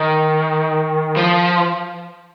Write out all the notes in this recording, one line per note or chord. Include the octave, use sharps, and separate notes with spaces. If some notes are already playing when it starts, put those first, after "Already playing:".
Already playing: D#3
F3